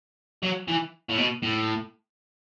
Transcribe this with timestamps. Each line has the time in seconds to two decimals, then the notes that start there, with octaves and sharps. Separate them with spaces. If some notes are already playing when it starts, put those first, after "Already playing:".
0.43 F#3
0.68 E3
1.09 A2
1.18 B2
1.43 A2